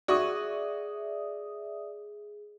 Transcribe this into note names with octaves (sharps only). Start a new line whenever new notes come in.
F#4 G#4 D5 E5 C#6 D#6